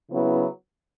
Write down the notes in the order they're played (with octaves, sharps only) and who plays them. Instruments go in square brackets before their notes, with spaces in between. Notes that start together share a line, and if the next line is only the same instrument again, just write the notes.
[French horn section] C#3 F#3 B3 E4